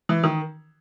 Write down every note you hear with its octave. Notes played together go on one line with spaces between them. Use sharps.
E3
D#3